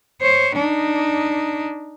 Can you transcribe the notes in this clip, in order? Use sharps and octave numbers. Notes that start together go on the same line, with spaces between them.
C5 C#5
D4 D#4